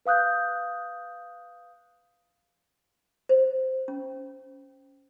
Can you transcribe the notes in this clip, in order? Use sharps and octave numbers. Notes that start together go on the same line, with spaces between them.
B4 F5 D#6 F#6 G6
C5
C#4